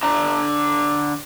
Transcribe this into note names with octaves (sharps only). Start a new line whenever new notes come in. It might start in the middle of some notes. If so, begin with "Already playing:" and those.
D3 D4 A#5